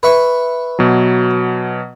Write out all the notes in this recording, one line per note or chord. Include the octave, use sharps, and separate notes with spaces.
B4 E5 C#6
B2 F#3